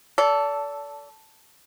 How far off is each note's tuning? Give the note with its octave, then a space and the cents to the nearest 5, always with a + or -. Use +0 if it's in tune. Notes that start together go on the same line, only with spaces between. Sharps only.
A4 +0 D5 -35